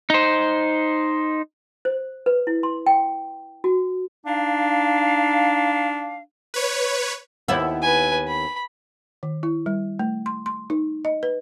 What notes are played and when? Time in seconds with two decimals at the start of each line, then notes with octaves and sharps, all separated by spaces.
0.10 D#4 C5
1.85 C5
2.26 B4
2.47 E4
2.63 C6
2.86 G5
3.64 F#4
4.26 D4 D#4 F5
6.54 B4 C#5
7.48 D#2 B3 E4
7.82 B4 G#5
8.28 B5
9.23 D#3
9.43 E4
9.66 G3
9.99 A3
10.26 C6
10.46 C6
10.70 D#4
11.05 D#5
11.23 B4